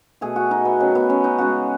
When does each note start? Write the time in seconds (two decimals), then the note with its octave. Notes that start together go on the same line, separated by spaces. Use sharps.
0.21 B2 A3 G#4
0.36 F#4
0.51 D#4
0.65 B3
0.80 D#3 F#3 A3 C#4
0.95 B3
1.10 C#4
1.24 D#4
1.38 C#3 G#3 F#4